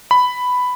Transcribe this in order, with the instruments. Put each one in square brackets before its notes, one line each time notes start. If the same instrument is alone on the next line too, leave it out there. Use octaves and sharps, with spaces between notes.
[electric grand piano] B5